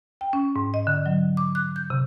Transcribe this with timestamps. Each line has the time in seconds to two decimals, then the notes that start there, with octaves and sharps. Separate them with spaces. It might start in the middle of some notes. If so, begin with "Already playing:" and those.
0.21 G5
0.33 C#4
0.56 G#2
0.74 D#5
0.87 D3
1.06 F#3
1.37 D6
1.55 F#6
1.76 G6
1.90 C3